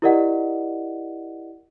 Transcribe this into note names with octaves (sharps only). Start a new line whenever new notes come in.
E4 G4 A#4 D5 D#5 F#5